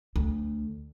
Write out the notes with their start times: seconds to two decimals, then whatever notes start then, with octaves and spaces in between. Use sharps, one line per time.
0.16 D2